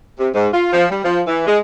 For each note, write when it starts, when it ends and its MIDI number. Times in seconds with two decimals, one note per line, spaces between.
0.19 0.28 48
0.34 0.48 44
0.54 0.72 65
0.73 0.85 53
0.90 1.02 55
1.04 1.21 53
1.27 1.45 52
1.47 1.58 56